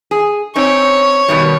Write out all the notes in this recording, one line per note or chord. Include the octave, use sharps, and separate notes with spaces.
G#4
C4 C#4 D#4 C#5
B2 D#3 G3